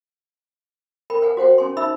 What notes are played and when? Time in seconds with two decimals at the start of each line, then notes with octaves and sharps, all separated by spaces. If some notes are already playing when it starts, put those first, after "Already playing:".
1.10 A#4 G5 B5
1.22 B4 F#5 G#5
1.37 F#4 C5 F#5 G5
1.58 C#4 G#5 C6
1.77 D#4 E5 B5 E6